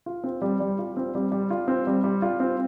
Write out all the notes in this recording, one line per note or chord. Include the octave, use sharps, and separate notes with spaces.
F4
C4
G3
G3
F4
C4
G3
G3
F4
C4
G3
G3
F4
C4